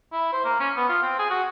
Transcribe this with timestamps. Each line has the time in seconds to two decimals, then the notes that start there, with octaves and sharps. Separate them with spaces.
0.12 E4
0.33 C5
0.44 A#3
0.60 C#4
0.76 B3
0.89 F4
1.02 C4
1.19 G#4
1.30 F#4